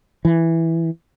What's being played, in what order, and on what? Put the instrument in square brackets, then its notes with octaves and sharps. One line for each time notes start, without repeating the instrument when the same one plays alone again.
[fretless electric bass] E3